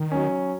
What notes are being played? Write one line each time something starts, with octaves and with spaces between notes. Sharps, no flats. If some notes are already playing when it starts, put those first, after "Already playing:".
Already playing: D#3
F#3 C#4